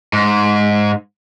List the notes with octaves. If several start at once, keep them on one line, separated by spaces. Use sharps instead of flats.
G#2